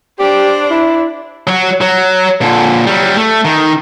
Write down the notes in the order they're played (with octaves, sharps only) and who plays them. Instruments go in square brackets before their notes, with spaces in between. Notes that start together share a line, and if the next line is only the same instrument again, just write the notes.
[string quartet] D4 C5 D5 [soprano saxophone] G4
[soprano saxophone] E4
[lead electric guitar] F#3 F#4
F#3
A#2 D3
F#3 G3
A3
D#3